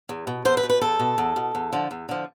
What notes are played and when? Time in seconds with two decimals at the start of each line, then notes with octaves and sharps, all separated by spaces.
0.09 E2
0.27 B2
0.45 E2 C5
0.57 B4
0.63 B2
0.70 B4
0.81 E2 A4
0.99 B2
1.18 E2
1.36 B2
1.55 E2
1.73 D3 F3
1.91 E2
2.09 D3 F3